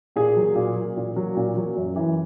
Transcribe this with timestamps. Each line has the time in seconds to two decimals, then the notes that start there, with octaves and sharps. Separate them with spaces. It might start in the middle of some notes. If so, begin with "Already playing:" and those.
0.16 A#2 G#4
0.37 F#3
0.55 A#2
0.76 F#3
0.96 A#2
1.16 F#3
1.37 A#2
1.56 F#3
1.77 F#2
1.96 E3